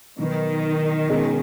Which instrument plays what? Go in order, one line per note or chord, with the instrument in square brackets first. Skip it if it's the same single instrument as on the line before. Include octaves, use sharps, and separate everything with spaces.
[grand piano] B2 F#3 D#4 B4 [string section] D#3
[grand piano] B2 G#3 C#4